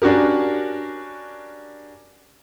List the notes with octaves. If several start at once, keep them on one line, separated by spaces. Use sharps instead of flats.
C#4 D4 F#4 G4 A#4